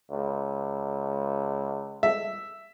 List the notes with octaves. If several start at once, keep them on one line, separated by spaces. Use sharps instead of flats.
C#2
E5